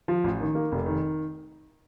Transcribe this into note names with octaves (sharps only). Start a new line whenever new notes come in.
F3
A1
D#3
A#3
F1
D#3